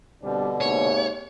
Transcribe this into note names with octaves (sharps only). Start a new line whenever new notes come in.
B2 D3 G3 C4 D4
G#2 C3 A#3 C#5